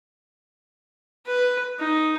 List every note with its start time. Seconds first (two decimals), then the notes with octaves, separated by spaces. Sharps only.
1.26 B4
1.79 D#4